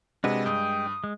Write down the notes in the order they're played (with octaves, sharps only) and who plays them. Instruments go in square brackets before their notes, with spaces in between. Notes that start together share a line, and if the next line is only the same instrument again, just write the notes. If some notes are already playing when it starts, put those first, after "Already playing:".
[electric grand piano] C3 [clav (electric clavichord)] G#3 [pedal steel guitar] D4 F#4 B4
[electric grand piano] G2 [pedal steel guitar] G5 [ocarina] D#6
[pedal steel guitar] G#3